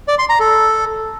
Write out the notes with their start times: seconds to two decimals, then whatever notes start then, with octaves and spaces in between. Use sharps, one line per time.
0.08 D5
0.19 C6
0.29 A#5
0.40 A4